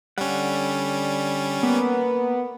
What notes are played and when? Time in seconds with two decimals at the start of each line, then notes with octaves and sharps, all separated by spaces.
0.18 D3 G3 C#4 F#5
1.63 A#3 B3